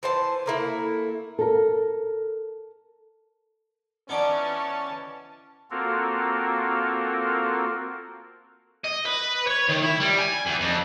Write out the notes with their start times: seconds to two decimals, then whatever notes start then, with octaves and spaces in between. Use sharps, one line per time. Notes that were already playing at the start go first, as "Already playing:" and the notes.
0.03 E3 C5 A5
0.46 A3 A#3 E4
1.39 A4 A#4
4.09 E3 B3 C#4 D#4 D5 A5
5.71 A#3 C4 F4 F#4 A4 A#4
8.85 D#5
9.06 B4
9.47 C#5
9.68 D#3
9.82 E4
10.00 G3
10.19 G#5
10.46 E2
10.60 F2